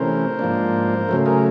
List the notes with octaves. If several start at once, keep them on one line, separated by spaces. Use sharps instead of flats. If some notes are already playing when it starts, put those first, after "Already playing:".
Already playing: C3 E3 A3 C#4 A#4 C5
G#2 F3 A#3 D4
C#3 F#3 A3
G#4 A#4